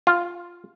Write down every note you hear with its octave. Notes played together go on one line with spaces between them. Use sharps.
F4